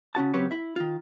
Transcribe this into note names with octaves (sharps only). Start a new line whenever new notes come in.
C#3 C#4 F#4 A5
C#3 F#3 C4 G4 B4 C#5
E4 E5
D#3 F4